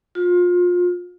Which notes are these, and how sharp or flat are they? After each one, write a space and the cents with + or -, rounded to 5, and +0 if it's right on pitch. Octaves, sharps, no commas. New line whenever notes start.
F4 +30